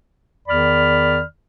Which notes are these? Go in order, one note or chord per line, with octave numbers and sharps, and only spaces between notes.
E2 D#3 D5 B5 F6